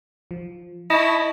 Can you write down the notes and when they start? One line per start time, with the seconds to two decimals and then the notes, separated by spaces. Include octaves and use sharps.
0.31 F3
0.90 E4 D#5 A5 C#6 D#6